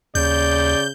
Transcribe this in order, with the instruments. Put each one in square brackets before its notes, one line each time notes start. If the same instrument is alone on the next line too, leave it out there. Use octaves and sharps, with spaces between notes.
[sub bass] D#2 [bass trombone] C#3 [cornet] D5 [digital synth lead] G6